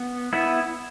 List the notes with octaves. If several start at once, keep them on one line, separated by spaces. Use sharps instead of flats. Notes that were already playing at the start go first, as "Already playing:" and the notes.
Already playing: B3
B3 E4